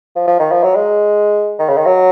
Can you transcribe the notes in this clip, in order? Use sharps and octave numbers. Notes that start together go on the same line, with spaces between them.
F3
F3
D#3
F3
F#3
G#3
D#3
C#3
D#3
F#3